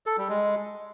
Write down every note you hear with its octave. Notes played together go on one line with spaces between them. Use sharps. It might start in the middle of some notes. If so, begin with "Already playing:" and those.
A4
G3
G#3